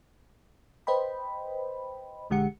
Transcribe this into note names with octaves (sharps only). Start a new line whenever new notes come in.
B4 C5 D#5 G5 B5
A#1 D3 G#3 G4 F#5 C#7